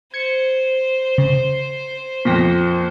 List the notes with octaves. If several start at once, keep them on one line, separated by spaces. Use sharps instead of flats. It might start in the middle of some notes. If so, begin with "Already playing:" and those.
C5 G#6 C#7
C#3
F2 A#2 A#6 B6